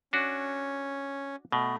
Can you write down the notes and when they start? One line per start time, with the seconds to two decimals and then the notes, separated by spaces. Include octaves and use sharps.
0.13 C#4 D4 F#4
1.52 B2 A3